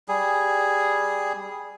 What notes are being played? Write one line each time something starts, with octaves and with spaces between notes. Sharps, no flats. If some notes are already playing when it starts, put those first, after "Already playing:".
G3 G#4